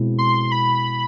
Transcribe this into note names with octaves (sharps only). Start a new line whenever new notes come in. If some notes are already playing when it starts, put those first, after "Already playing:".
Already playing: B2 G#3 C4 E4
C6
B5